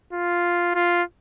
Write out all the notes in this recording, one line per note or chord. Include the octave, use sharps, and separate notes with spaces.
F4
F4